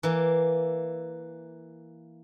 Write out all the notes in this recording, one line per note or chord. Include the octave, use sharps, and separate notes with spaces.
E3 A#3